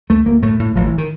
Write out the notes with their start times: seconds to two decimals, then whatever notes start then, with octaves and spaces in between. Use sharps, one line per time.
0.10 D2 A3
0.26 D2 A#3
0.42 A2 A3
0.59 A2
0.76 A1 F3
0.87 E3
0.98 D#3